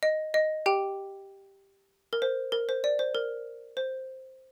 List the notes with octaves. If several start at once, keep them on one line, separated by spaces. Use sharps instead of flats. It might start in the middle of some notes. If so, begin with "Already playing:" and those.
D#5
D#5
G4 G5
A#4
C5
A#4
C5
D5
C5
A#4
C5